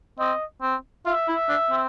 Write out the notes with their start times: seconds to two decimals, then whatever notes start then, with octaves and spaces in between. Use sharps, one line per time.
0.19 C4 D#5
0.62 C4
1.06 F4 E5
1.28 E4
1.49 D4
1.70 C4